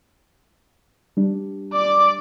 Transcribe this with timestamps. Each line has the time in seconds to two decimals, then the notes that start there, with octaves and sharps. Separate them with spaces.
1.17 G3 D4
1.73 D5 D6